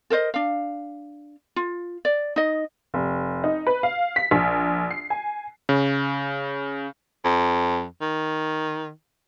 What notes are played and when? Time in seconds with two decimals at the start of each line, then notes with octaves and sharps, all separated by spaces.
0.10 A4 A#4 C5 D#5
0.34 D4 F5
1.56 F4
2.05 D5
2.36 D#4 D#5
2.94 F1
3.44 D#4
3.67 B4
3.83 F5
4.16 B6
4.31 A#1
4.91 C7
5.10 G#5
5.69 C#3
7.24 F2
8.01 D#3